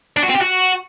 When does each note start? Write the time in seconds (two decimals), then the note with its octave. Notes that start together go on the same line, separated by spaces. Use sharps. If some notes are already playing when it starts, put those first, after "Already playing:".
0.17 D4
0.23 F#4
0.29 C4
0.35 G4
0.41 F#4